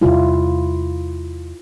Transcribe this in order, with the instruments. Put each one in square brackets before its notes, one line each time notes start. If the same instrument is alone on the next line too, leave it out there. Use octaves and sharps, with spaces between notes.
[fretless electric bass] E2 C3 G3 [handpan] E4 F4